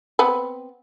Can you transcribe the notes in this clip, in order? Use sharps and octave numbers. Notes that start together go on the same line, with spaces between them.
B3 C4